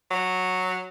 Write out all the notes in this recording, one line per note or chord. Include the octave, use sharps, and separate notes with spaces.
F#3